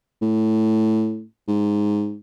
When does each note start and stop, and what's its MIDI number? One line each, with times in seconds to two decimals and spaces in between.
0.22 1.23 45
1.48 2.16 44